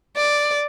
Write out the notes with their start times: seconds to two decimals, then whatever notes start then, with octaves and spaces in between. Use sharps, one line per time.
0.17 D5